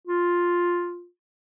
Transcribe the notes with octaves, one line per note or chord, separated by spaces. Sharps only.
F4